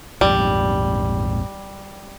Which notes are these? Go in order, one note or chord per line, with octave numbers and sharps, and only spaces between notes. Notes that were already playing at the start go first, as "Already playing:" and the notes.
A#1 F2 G#2 G3